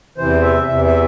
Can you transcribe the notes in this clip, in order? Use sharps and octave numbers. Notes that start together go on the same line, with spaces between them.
E2 C3 E3 C5
E5
E2 C3 E3 E5
E5